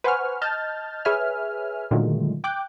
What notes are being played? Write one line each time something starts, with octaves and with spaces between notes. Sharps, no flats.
B4 C5 F#5 G#5 C#6 F6
D#5 A5 F6 G6 A6
G#4 B4 C#5 E5 G#5 F6
A#2 D3 D#3 F#3 G#3 A3
G5 D6 F#6 G6